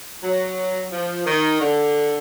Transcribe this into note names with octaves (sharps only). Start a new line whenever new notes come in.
F#3
F3
D#3
D3